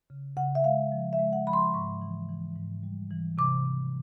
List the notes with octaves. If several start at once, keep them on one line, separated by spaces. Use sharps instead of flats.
C#3
C#3 F#5
E5
G#3 F5
F3
E5
G#3
F#5
F3 B5
C6
G#2 C#6
E3
E3
G#2
G3
E3
C3 D6
C3